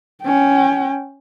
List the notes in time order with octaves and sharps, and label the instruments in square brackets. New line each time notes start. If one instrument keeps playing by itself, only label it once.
[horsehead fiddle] C#4 G5